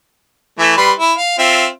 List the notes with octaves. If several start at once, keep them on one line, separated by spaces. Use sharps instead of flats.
E3 A3
G3 B4 C6
E4
F5
C4 F4 E5